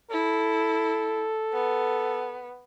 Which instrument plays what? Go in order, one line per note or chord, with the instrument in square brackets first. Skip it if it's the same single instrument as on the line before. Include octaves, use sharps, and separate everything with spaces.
[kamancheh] E4 [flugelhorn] A4
[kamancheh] B3